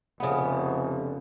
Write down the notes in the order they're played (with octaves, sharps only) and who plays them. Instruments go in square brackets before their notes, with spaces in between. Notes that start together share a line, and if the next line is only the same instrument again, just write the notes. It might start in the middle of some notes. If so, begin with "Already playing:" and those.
[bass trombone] F1 [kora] C#3 B3